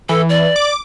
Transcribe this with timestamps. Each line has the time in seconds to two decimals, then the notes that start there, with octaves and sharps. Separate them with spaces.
0.09 E3 A4
0.29 D5
0.56 D6